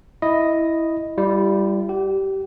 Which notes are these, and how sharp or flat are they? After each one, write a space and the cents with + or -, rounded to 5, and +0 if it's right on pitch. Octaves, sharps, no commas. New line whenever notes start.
E4 -5 D#5 +0
G3 +0 E4 +45
G4 -20 F#5 +45